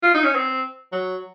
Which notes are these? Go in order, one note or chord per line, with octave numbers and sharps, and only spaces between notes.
F4
D#4
C#4
C4
F#3